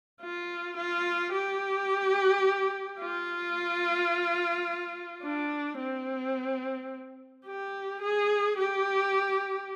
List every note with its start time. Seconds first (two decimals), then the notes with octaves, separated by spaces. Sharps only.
0.22 F4
0.77 F4
1.33 G4
3.01 F4
5.23 D4
5.79 C4
7.46 G4
8.02 G#4
8.58 G4